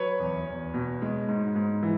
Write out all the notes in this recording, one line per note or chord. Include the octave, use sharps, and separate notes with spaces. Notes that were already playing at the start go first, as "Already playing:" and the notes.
Already playing: F#3 B4 C#5
E2
E2
B2
G#3
G#2
G#2
E3